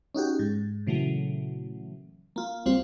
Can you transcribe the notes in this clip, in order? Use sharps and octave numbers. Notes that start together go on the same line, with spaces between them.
C#4 D#4 F#4 G4
G#2
A#2 C#3 E3 F#3 A3
A#3 F4
C#2 G3 C4 F4 C5